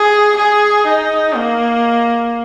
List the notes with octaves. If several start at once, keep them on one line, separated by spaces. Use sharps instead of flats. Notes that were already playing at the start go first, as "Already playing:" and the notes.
Already playing: G#4
G#4
D#4
A#3